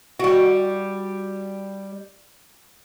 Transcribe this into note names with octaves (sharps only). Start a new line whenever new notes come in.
G3 F#4